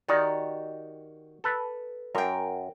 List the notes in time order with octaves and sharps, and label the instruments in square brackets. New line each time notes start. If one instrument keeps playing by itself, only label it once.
[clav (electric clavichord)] D#3 D#4 [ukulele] F#4 G4 D5
[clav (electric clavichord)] A4 B4
[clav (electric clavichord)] F#2 [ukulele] A#4 G5